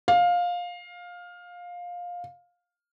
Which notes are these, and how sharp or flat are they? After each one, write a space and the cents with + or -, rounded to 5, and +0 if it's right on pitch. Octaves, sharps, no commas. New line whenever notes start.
F5 +15